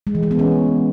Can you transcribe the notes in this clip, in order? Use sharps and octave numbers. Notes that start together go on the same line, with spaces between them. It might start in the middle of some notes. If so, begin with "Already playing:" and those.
G#3
E3
G#3
B3
C#4